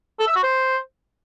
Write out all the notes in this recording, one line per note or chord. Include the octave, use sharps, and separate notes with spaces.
A4
E5
F#4
C5